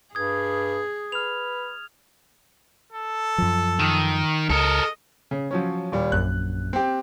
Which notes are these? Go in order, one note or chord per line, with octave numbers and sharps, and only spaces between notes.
G2 G#4 D#6 G#6
B4 F6 F7
A4
F#2 F3
D#3
C#2 A4 A#4 D#5
C#3
F3 F#3 C#4
D#2 A#2 G3
A#1 F#2 F#6
C4 G4